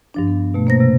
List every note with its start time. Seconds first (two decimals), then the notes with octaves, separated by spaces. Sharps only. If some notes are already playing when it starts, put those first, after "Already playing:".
0.14 G2 F3 D4
0.28 B3
0.54 B2 A3
0.67 A#3 C5 A#6
0.80 C3